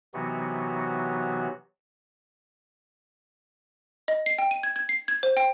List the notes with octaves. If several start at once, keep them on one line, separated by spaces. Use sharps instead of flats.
C3 E3 F#3 B3 D#4 F#4
D#5
C7
G5
D#7
G#6
G#6
C7
G#6
C5
G5